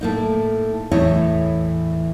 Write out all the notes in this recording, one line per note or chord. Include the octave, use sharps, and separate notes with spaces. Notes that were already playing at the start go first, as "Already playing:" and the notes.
A2 A#3 D#4
E2 A2 E3 E4 C#5 D#5